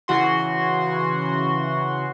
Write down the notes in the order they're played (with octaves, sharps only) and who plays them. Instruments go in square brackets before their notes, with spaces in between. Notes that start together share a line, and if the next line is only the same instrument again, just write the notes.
[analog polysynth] C#3 E3 F#4 C6